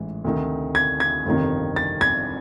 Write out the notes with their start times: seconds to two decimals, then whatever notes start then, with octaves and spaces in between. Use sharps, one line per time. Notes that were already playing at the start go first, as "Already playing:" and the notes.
Already playing: A1 G#2 E3
0.24 D2 C3 D#3
0.75 G#6
1.00 G#6
1.25 G1 F2 C3 D#3
1.76 A6
2.01 G#6